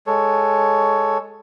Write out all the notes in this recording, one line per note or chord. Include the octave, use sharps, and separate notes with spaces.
G#3 A4 C#5